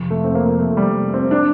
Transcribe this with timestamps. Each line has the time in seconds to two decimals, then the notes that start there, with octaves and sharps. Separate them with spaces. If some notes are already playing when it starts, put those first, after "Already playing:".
Already playing: F2 C3 F3
0.10 A3
0.24 C4
0.35 A#3
0.58 A3
0.77 G3
1.14 C4
1.31 D4